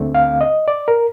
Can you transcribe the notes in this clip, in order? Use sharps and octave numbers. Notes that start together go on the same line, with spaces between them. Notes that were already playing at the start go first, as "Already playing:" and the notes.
Already playing: D2 D3 A3 C4
F5
D#5
D5
A#4